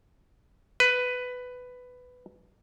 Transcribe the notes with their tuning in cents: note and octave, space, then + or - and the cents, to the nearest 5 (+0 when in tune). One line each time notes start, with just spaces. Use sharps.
B4 +10